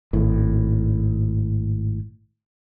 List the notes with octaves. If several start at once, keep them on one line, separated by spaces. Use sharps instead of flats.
G#1 A2